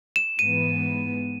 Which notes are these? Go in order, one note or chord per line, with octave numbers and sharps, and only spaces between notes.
E7
G#2 E3 B3 D#7